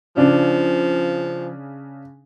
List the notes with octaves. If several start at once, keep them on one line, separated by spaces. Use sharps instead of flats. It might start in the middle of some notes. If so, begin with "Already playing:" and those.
C#3 F3 D4